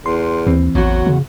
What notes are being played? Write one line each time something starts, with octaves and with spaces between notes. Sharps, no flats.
E2 C6
D#2 E3 C4
A1 E2 F#3 F#4
C#3